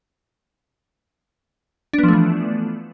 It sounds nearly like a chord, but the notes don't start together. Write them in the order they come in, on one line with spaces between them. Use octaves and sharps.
D4 B3 F3 A3 E3